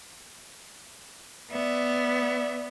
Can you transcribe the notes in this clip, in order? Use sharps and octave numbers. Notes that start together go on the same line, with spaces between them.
B3 D5 E5